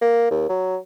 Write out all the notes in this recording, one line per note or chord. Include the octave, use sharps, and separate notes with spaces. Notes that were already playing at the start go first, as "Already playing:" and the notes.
A#3
D#2
F#3